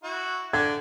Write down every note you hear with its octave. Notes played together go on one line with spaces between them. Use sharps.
E4 F#4
D3 D5 G5 G#6